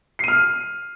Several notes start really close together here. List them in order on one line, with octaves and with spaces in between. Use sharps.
C7 D#7 F6